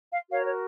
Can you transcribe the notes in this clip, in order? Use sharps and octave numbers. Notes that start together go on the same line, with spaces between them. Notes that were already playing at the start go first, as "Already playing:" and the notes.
F5
F#4 A#4 C#5 F5
C#5